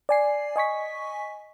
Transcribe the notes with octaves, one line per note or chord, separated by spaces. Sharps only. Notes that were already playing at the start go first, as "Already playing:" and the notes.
D5 G#5 C7
D#5 G#5 C#6 B6